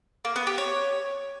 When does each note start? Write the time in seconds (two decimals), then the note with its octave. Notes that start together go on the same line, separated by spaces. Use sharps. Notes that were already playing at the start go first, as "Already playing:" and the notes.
0.25 A#3
0.36 B3
0.47 G4
0.58 C#5